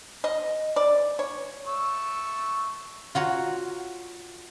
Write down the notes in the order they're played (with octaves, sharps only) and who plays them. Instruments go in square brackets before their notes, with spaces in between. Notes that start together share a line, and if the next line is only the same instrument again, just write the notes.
[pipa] D#5
D5
C#5
[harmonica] A3 C#6 E6
[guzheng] F4 F#4 C#5 A#5